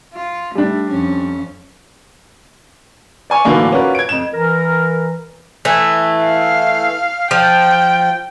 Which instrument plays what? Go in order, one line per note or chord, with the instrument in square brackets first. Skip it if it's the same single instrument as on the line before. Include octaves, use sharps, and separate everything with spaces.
[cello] F4
[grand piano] G3 D4 [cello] A3
[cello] F2 C#4
[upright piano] D5 G#5 C#6
A2 D3 E3 F#3 A#3 D4
C#4 F4 F#4 A#4 B4 D5
G#6 D7
F2 E7
[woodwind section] E3 A#4
[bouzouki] E3 A3
[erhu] F5
[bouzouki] F3 [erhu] G5